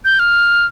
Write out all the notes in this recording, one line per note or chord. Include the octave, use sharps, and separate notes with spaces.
G6
F6